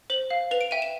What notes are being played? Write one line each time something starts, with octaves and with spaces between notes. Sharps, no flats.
C5 F#7
F5
B4 F7
D7
E5 G5 D#7
E7